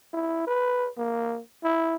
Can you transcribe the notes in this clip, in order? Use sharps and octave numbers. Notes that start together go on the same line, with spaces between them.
E4
B4
A#3
E4